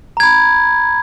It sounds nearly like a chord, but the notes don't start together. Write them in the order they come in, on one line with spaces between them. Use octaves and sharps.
A#5 G#6 B5